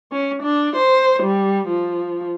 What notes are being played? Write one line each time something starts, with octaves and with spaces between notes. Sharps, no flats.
C#4
D4
C5
G3
F3